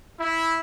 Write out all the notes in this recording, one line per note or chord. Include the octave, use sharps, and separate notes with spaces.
E4